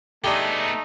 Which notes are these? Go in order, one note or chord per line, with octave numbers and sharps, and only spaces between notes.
G#3 A3 B3 D4 D#4 G4